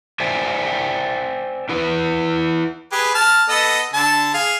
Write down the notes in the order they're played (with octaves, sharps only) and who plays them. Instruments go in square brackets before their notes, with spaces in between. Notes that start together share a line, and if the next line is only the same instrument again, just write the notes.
[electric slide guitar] C5 D5 E5 G5 G#5
E4 B4 F#5
[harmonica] G4 G#4 B4
A5 F6
B3 A4 D#5
D3 A5
G#4 F5